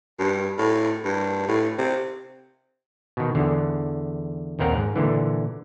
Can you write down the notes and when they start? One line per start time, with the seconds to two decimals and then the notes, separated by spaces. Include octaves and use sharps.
0.19 G2
0.58 A2
1.04 G2
1.48 A2
1.78 C3
3.17 B2 D#3
3.35 E2 D3
4.59 A#1 D#2 C4 A#4 F#5
4.75 G#2
4.96 A#2 D3 E3